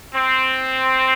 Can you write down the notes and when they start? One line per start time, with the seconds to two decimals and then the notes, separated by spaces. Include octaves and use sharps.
0.15 C4